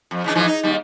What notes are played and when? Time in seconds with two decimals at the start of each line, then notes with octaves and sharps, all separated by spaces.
0.11 F2
0.24 C#3 E3 D4
0.35 G#2 E3 F3
0.47 D#4
0.63 D#2 G3